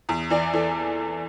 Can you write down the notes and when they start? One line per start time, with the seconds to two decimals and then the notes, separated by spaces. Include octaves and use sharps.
0.09 E2
0.30 E3 D5
0.53 E3 A4